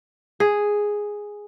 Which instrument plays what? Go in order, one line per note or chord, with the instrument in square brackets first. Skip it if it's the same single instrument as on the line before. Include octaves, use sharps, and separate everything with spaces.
[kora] G#4